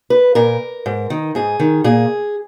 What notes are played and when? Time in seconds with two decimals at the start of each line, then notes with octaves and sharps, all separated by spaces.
0.10 B4
0.35 A#2 A#4
0.86 G#2
1.10 D#3
1.35 G#2 G#4
1.60 D#3
1.84 A#2 G#4